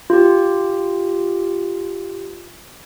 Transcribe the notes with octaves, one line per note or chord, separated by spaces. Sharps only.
F4 G4